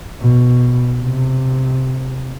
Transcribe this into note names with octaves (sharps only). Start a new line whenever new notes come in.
B2
C3